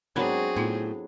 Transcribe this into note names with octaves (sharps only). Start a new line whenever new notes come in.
G#2 F#3 B3 C4 D4 G#4 A#4 B5
A2 B3 D#4 F4